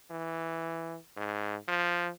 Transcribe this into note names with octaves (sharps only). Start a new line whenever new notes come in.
E3
G#2
F3